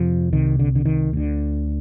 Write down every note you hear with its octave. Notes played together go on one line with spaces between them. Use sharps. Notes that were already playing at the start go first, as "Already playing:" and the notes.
Already playing: F2 C3 F3
C2 C3 D#3
D3
D3
D#3
D2 D3